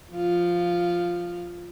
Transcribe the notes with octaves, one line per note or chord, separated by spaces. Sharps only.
F3 F4